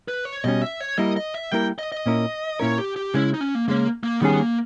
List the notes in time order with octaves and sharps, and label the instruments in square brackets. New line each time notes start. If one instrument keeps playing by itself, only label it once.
[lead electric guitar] B4
C#5
[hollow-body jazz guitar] B2 G3 C#4 [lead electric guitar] D#5
[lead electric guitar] E5
C#5
[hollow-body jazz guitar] G3 A#3 E4 A#4 [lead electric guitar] D#5
[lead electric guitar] D#5
E5
[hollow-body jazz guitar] G3 A#3 E4 A#4 [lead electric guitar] G5
[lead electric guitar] D#5
D#5
[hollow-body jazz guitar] A#2 A#3 C#4 E4 A#4
[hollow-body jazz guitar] A#2 A#3 C#4 E4 A#4 [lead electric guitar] C#5
[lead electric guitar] G4
G4
[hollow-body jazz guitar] C#3 G#3 C#4 [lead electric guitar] E4
[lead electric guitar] D#4
C#4
A#3
[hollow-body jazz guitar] C#3 G#3 C#4 [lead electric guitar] A#3
[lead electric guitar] A#3
[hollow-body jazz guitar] D#3 G3 C#4 G#4 [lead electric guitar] B3
[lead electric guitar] A#3